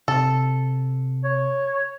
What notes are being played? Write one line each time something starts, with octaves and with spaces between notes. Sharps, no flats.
C3 A4
C#5